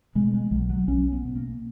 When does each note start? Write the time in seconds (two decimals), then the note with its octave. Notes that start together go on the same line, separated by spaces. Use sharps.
0.15 B2 G#3
0.34 G#3
0.51 B1 F#3
0.70 F#3
0.88 B1 C#4
1.12 B3
1.25 B2
1.36 A#3